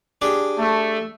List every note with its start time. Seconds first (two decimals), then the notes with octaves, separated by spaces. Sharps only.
0.22 D4 G4 G#4
0.59 A3